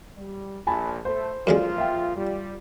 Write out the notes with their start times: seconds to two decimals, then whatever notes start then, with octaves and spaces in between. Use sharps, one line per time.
0.17 G3
0.67 A#1 G#5 A5 B5
1.05 A3 C5
1.47 F#2 A#2 D3 F3 G#3 F4
1.78 E5 G5
2.17 G3 F4